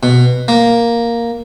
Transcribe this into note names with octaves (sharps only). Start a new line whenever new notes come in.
B2
A#3